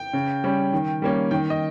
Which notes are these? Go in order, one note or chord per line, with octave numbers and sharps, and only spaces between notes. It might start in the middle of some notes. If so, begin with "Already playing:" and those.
Already playing: G5
C#3
G3 C#4
D#3
G3 A#3 C#4
D#3 G5
D#5